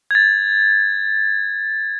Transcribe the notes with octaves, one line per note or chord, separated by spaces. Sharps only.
G#6 A6